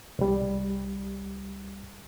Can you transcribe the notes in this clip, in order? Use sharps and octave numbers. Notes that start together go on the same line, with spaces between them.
C2 G3